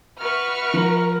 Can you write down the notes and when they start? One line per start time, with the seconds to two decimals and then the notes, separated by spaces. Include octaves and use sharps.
0.19 F#4 B4 E5 C#6 F6
0.74 F3 A#4